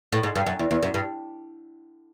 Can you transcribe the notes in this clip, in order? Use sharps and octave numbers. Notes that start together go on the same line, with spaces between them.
A2
G#2
G2
F#2
E2
E2
F#2
G2